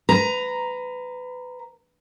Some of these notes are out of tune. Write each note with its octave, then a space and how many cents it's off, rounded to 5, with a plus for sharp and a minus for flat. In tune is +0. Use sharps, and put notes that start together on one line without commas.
B4 +25 A#5 +0